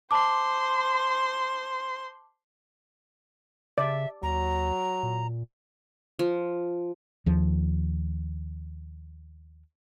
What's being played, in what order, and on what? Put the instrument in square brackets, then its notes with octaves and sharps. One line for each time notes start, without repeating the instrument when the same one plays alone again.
[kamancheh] C5 C6 [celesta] A5 D6
[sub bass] C#3 [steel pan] D5 [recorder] E5
[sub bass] D#2 [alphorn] F#3 [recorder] A#5
[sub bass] A#2
[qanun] F3
[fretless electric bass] D#2 F3